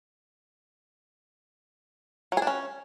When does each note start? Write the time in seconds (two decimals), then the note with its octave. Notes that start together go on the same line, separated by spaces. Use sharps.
2.32 F#3
2.37 G#4
2.42 D4
2.47 C#4